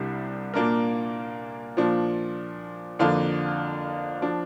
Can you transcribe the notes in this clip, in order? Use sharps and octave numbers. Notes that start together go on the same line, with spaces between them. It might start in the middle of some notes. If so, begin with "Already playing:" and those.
Already playing: C2 C3 G3 D4
A#2 A#3 D4 A#4
A#2 F3 D4
F2 D3 A#3 D4 F4
F3 D4